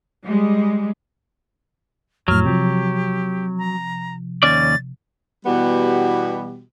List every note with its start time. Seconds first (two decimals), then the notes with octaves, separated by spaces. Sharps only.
0.25 G3 G#3
2.28 F2 A2 F#3 F6
2.45 C3 F3 G4
3.58 A#5
4.43 D#2 C#4 D5 A6
5.46 B2 E3 G3 B3 F#4 G4